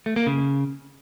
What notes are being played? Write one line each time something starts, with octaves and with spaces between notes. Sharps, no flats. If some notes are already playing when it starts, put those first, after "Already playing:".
A3
A#3
C#3